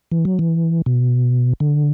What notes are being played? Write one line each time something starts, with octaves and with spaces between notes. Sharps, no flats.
E3
F#3
E3
B2
D3